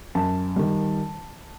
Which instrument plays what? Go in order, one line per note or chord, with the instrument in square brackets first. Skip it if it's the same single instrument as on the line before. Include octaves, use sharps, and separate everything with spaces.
[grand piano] F#2 A5
D#3 G3